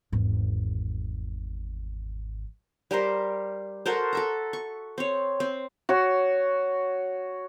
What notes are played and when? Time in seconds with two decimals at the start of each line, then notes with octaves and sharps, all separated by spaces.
0.12 G#1 E2
2.91 G3 G4 A#4 C5
3.86 F#4 A4 A#4 C5
4.13 A4 E5 A#5
4.53 C#6
4.98 C4 C#5
5.40 C4
5.89 F#4 C#5